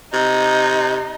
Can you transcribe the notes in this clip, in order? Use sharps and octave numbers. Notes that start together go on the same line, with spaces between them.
C3 D#4